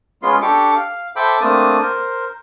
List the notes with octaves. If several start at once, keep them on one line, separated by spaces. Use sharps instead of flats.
G#3 B3 C#4 F4 C6
D4 G4 A4 C#6 D6
F5
A4 C5 E5 G5 B5 D6
A3 A#3 C4 D4 A5 D#6
A#4 C5